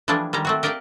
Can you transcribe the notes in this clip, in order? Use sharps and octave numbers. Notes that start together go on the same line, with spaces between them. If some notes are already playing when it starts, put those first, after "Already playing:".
E3 F3 G3 A3 D4 G#4
D#3 G3 G#3 A#5
A3 C4 F#4
G4 A#4 D5 D#5 F5 G5